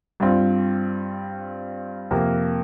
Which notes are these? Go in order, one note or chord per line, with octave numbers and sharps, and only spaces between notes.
G2 G3 C4 F4
F2 C3 A#3